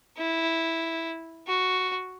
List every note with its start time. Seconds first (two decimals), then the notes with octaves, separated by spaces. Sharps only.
0.18 E4
1.48 F#4